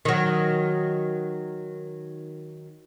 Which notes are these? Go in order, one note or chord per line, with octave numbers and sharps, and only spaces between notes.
D#3 F#3